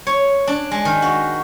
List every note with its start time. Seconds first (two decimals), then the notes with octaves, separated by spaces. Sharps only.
0.07 C#5
0.47 D4
0.71 G#3
0.85 D#3
1.02 F#4